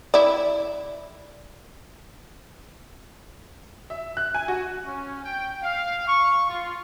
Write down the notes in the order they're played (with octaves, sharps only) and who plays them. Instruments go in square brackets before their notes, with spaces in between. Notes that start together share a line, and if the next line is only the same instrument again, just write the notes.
[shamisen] E4 D5
[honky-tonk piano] E5
F#6
G#5
F#4
[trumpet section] C#4
G5
F5
C#6
F4